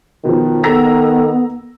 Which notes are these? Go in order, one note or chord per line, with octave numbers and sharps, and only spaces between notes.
B2 D#3 F3
B3 A4 A#5 E6 A#6